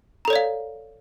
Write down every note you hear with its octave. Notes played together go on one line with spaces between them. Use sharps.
A4 C#5 D5 F5 A#5